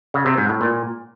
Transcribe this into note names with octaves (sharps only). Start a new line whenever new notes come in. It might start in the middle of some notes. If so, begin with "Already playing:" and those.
C#3
C3
G#2
A2
A#2